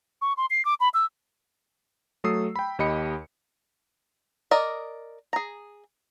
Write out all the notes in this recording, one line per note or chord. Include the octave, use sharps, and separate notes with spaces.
C#6
C6
C7
D6
B5
E6
F#3 A3 A4 D#6 E6 C7
G5 B5
D#2 G4 D#5 B5 C#7
A#4 D5 D#5
G#4 A#5